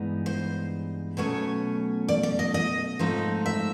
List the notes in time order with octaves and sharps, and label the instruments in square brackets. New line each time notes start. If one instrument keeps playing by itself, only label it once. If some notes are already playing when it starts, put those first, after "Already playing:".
Already playing: [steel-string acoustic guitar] G2 E3 G#3 B3 D#4
C5
B2 F#3 A3 C#4 C#5
D5
D5
D#5
D#5
G#2 F3 A3 C4 D#4
E5